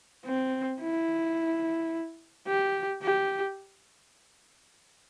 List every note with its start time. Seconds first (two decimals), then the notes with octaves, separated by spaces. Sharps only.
0.25 C4
0.81 E4
2.47 G4
3.02 G4